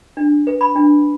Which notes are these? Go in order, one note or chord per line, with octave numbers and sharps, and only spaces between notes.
D4
B4
B5
D4